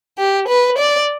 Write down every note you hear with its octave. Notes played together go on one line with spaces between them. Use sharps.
G4
B4
D5